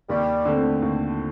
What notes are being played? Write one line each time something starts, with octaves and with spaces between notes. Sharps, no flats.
D#2 G3
D3 A3 C4
D#2